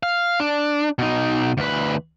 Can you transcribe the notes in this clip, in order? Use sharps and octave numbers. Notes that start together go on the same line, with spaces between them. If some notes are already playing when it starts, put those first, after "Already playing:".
F5
D4
B2 D#4
D2 B4